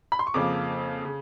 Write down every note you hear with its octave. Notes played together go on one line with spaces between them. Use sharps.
B5
C6
C#6
F2 C#3 F3 A#3 D6
C#3